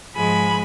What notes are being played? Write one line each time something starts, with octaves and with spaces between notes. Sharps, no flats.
G#2 F3 G#3 G#5 B5